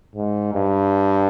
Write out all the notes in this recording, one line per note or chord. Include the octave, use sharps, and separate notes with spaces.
G#2
G2